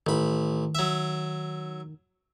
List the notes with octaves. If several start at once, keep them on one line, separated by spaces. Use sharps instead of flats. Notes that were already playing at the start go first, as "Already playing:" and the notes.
A1 D#3 B5
F#3 E5